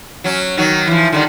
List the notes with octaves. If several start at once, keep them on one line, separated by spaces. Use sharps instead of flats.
F#3 C#4
D#3 F#3
E3 F3
D3 D#3 G3